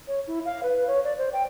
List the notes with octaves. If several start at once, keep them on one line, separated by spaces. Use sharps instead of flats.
C#5
E4
F5
B4
C#5
D5
C5
G5